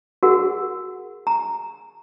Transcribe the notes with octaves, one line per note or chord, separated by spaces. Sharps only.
F#4 G#4 A#4 F#5
A#5